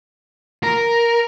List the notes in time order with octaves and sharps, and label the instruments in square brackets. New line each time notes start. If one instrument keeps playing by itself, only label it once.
[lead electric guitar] A#4